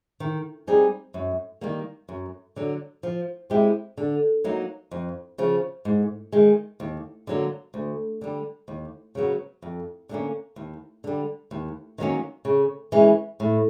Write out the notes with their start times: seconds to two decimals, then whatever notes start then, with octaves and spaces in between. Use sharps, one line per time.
0.20 D#3
0.67 G3 C4 D#4 G#4
1.14 F#2
1.61 D#3 G3 A#3
2.09 F#2
2.56 D3 F#3
3.03 F3
3.50 G#3 C4 E4 G4
3.97 D3
4.44 F#3 A#3 D#4
4.91 F2
5.38 C#3 F3
5.85 G#2
6.32 D#3 G#3
6.80 D#2
7.27 D3 F#3 A#3
7.74 D2
8.21 D3 G3
8.68 D#2
9.15 C#3 F#3 B3
9.62 F2
10.09 D3 G3 A#3 C#4
10.56 D#2
11.04 D3 G3
11.51 D#2
11.98 D#3 F#3 A#3 C#4
12.45 C#3
12.92 E3 G#3 C#4
13.40 A2